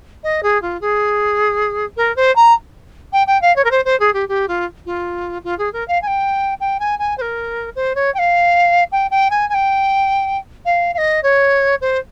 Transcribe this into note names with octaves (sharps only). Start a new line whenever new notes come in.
D#5
G#4
F4
G#4
A#4
C5
A#5
G5
G5
F5
C#5
A#4
C5
C5
G#4
G4
G4
F4
F4
F4
G#4
A#4
F5
G#5
G5
G5
G#5
G#5
C5
A#4
C5
C#5
G5
F5
G5
G5
G#5
G#5
G5
F5
F5
D#5
C#5
C5